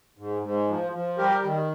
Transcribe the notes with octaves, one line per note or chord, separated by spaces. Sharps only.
G#2
G#2
F3
F3
G3 G4 A#4
D#3